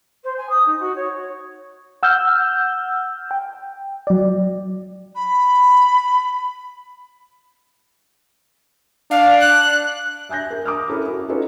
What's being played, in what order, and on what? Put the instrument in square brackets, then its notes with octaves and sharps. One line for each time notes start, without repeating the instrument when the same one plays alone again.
[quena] C5
G#5
D#6
D#4
F#4
C#5
[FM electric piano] F#5 E6 F6 G6
G5
F#3 D5
[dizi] B5
[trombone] D4 [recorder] F5
[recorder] F#6
[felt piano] E5 G#5 F#6 G6 A#6
A#4
A#5 D6 D#6 F6
C#4 E4 A4 A#4
F#4
C#4 D#4 F4 F#4 A4 B4